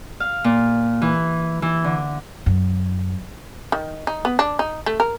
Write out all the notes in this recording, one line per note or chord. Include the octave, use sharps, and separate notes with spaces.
F5
A#2
E3
E3
D3
F#2
D#3
D#4
B3
D4
D#4
A3
A#4